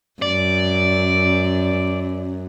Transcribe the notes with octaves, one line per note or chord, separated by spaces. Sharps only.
F#2 D5